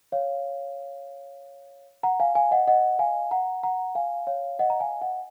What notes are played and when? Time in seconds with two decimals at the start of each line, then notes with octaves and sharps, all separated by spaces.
0.12 C#5 F5
2.03 F#5 A#5
2.20 F5 G#5
2.35 F5 G#5
2.51 D#5 F#5
2.67 D#5 F#5
2.99 F5 G#5
3.31 F#5 A#5
3.63 F#5 A#5
3.95 F5 G#5
4.27 C#5 F5
4.59 D#5 F#5
4.70 A#5
4.80 F5 G#5
5.02 D#5 F#5